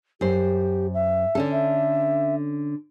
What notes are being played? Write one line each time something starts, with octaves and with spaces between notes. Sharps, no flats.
F#2 G4 C5
E5
D3 C#4 A4
E5